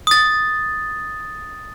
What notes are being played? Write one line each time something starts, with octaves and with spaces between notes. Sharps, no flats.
D#6 A6